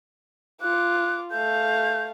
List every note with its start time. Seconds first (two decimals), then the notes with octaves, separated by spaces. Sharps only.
0.62 F4 D6 F#6
1.31 A3 F5 G6